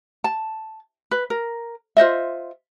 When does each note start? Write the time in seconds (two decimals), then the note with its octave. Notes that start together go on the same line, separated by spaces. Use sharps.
0.24 A5
1.11 B4
1.30 A#4
1.97 F4 C5 D#5 E5